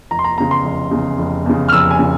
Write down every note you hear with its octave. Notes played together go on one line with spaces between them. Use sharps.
F1 A#5
C6
A#5
E2 C#3 A#5
C6
F1
E2 C#3
F1
E2 C#3
F6
F1 E6
G#5
C#3